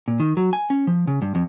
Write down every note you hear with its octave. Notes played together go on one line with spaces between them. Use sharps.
A#2
D#3
F#3
G#5
C#4
F3
C#3
G2
F2